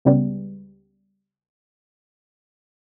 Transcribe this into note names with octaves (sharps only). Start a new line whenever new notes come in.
C#2 C#3 G3 B3